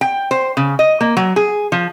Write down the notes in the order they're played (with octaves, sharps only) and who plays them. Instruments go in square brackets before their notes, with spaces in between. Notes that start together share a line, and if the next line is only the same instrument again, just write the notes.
[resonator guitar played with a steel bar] G5
C5
C#3
D#5
A#3
F#3
G#4
F3